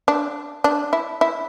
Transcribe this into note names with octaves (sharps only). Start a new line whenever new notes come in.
D4
D4
E4
E4